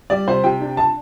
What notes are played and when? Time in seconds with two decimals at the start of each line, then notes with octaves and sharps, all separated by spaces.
0.10 G3 D5
0.28 C3 C5
0.44 C3 G5
0.60 D4
0.77 A5